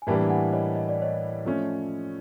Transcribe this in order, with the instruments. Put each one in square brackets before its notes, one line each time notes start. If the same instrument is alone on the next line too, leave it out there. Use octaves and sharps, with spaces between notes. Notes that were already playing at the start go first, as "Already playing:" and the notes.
[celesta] G#5
[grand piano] A2 E3 G3 A#3 D4 [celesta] G5 A5
[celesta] F#5 G#5
C#5 D#5
D#5
D5
C#5 D#5
[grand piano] F3 A3 C#4